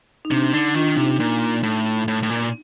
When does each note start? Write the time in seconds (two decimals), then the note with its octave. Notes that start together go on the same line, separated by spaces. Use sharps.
0.25 D#4
0.31 C3 D4
0.53 D3 D#4
0.75 D#3 D4 F4
0.97 C3 D#4
1.20 A#2
1.63 A2
2.08 A2
2.23 A2
2.30 A#2